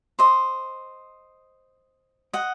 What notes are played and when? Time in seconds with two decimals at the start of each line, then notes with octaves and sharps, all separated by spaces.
0.19 C5 D#5
2.33 D#5 F#5